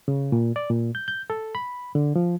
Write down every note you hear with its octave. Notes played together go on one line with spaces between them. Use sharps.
C#3
A#2
D5
A#2
G6
G6
A4
B5
D3
F3